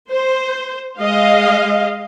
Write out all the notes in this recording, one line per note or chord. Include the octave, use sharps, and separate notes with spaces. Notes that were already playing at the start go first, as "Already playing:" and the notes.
C5
G#3 D#5 F5